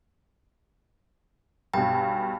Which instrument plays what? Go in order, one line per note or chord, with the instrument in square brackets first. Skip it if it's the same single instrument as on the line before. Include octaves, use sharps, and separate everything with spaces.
[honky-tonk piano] B1 G2 [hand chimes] G5